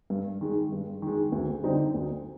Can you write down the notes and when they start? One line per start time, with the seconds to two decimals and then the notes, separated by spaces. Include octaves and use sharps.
0.10 G2
0.41 D#3 G#3
0.72 G2
1.02 D#3 G#3
1.32 D2
1.64 D3 G3 C4 D#4
1.95 D2